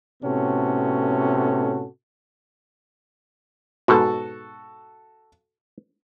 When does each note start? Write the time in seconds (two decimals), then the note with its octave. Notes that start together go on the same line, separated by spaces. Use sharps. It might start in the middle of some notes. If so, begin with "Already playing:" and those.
0.23 A2 C3 B3 C#4 F#4 A4
3.88 G#2 B2 F#4 A4